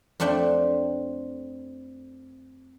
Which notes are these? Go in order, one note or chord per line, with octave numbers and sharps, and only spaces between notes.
F2 A3 C4 D4 G5